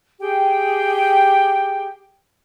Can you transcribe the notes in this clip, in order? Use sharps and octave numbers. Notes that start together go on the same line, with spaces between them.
G4 G#4 G5